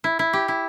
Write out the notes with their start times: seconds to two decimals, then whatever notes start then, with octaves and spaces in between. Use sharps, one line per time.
0.04 E4
0.19 E4
0.33 G4
0.48 E4